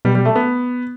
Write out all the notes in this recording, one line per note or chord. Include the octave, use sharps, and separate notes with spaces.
B2 G3
G3
A3
B3